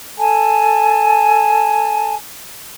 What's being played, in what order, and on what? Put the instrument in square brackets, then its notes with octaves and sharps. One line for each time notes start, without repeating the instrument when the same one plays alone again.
[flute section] A4 G#5 A5